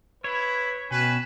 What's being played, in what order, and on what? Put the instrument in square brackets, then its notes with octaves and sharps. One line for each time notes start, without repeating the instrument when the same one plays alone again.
[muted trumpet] E4 [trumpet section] B4 [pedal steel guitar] C#5
[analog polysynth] B2 E7 [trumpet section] C#4 G5 G#5 [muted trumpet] B4